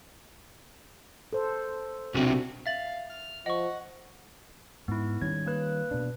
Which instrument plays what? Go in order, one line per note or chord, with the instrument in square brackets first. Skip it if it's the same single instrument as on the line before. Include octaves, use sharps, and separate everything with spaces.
[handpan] A4 C5
[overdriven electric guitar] B1 C3 [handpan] D4 F#4
[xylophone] E5 A6 F#7 [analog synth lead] F5
[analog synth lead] F6
[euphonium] F3 [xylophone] D#5 C#6 [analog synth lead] F#5
[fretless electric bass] G#2 [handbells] B3 E4
[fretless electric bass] D#3 G3 C#4 [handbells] G#6
[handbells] A#3 B4 F#6
[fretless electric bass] B2 D4